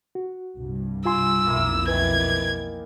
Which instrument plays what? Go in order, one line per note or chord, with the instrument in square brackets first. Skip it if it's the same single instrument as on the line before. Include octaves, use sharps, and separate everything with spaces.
[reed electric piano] F#4
[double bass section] C2 G2
[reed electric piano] F4 G#5 C6 [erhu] E6
[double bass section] B1 F2 [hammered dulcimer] A#3 E4
[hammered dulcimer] D#3 E3 [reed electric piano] B4 [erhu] G#6